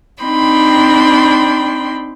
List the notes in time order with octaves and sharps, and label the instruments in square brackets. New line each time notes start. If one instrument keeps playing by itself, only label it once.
[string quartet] C4 D4 D#4 G5 B5 C6